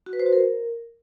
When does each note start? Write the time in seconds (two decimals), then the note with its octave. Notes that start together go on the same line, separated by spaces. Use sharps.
0.06 F#4
0.13 B4
0.20 C5
0.26 F#4
0.33 A#4